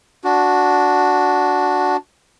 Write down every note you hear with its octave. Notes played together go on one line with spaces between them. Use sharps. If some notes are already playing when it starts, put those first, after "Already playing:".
D4 F#4